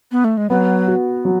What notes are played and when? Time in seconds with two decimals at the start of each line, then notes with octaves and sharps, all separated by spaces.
0.12 B3
0.24 A3
0.37 G#3
0.49 F#3 B3
0.88 F#4
1.25 F#3